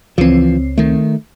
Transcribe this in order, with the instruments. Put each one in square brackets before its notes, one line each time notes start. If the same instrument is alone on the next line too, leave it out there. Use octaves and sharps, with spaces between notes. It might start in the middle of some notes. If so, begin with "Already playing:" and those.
[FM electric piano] C#2 C4 [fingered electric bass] E3 F3
[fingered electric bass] D#3 A3